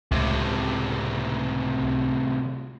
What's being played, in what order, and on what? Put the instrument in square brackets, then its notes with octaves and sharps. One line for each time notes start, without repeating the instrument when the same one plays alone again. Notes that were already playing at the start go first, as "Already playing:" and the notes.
[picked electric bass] C#2 [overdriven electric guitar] A2 C3